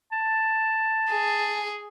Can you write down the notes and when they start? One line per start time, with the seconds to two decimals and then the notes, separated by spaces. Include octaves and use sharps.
0.12 A5
1.11 G#4